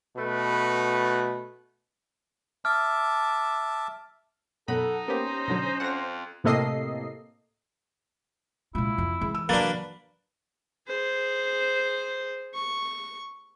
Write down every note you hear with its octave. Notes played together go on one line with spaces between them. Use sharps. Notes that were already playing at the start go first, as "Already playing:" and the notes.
B2 A3 F#4 B4
E5 A5 D6 F6
F#2 B2 D#4 A4 F#5 B5
A#3 B3 C#4 G4 C5
B2 D3 F#3
F2 F#5 A#6
A2 C3 A#3 A4 D#5 C7
A#2 G#3 E4 F4
F2
E3 G#3
E6
F#3 A#3 D4 B4 A6
G#4 C5
C#6